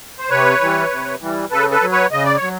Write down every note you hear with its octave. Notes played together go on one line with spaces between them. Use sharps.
C5
C3 B4 C#5
E3 G3
C3
E3 G3
C#3 A4 B4
A4 B4
F#3
B4 C#5
C#3 D#5
D5
C#5
F#3